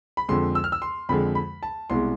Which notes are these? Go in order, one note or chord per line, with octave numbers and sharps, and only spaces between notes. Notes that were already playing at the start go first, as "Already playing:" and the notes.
B5
F2 D3 G#3 C6
E6
F6
E6
C6
F2 D3 G#3 B5
B5
A5
C2 B2 G#3 C6